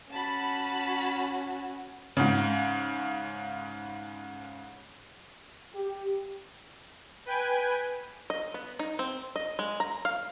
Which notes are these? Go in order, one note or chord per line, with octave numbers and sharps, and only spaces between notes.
C#4 F#4 A5 B5
G#2 C#3
G4
B4 G5 G#5
D#5
B3
D#4
C4
D#5
G#3
A#5
F5